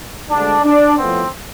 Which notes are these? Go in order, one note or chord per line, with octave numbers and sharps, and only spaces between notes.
D2 D3 G#3 D4
D4
A2 F3 B3 C4